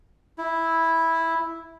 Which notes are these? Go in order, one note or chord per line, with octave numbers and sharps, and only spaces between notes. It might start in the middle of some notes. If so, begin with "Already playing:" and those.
E4